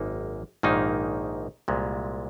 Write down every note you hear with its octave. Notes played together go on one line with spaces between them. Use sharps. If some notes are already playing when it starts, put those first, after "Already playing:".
Already playing: G#1 F#2 A#3 D#4
A#1 G#2 D#3 A#3 D#4
C2 A#2 G#3